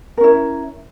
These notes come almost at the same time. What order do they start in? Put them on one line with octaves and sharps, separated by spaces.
A#4 C#4 E4